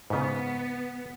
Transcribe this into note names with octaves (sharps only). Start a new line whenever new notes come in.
G#2 C#3 B3